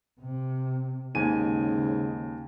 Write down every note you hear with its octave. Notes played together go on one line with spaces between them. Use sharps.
C3
D#2 G#2 C#3 G#5 D#7